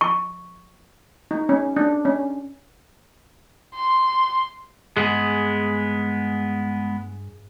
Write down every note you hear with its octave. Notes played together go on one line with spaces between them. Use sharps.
C#6
D#4
C#4
D4
C#4
C6
G2 G#3 B3 G#4